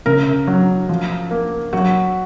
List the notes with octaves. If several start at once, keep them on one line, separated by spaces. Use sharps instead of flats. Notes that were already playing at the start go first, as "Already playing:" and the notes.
C#3 A#4
F#3
F3
A#3
F#3 F#4